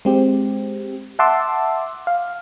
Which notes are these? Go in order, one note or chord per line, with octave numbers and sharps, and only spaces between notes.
G#3 C4 G4
E5 F#5 A5 C6 D6 E6
F5